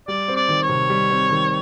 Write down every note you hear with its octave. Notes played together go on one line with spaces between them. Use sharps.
G3 D5
C4
D5
D#3
C#5
C3
G3
C4
D#3